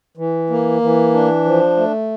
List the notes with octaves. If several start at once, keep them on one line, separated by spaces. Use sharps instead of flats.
E3
A#3
E3
D4
F3
A3